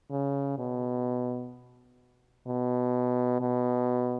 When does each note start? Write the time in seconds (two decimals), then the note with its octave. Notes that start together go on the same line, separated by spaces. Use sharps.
0.11 C#3
0.58 B2
2.47 B2
3.40 B2